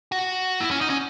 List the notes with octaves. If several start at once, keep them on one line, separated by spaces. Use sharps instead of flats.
F#4
E4
C#4
D#4
C#4